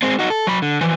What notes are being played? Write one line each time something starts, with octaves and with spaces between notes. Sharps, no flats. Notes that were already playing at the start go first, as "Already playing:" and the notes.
G#3 C4
D#4 F#4
A4
F#3 B5
D3
E3 F3